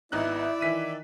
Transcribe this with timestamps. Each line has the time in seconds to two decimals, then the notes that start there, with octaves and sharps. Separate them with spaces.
0.12 G#1 B3 D#4 E4 D5 E5 F#6
0.61 D#3 E3 B6 D#7